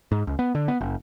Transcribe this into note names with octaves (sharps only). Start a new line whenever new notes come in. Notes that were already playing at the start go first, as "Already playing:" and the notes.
G#2
C#2
B3
D3
B3
F#1